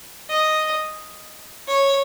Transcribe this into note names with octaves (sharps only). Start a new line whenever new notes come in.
D#5
C#5